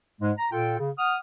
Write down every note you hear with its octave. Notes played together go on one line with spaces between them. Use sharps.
G#2 G#3
A#5
A#2 F4 A4 G5
C#3
F#5 D#6 F6